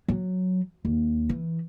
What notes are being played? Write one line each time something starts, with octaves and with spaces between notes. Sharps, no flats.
F#3
D#2
E3